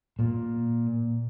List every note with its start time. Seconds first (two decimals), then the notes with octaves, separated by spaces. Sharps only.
0.19 A#2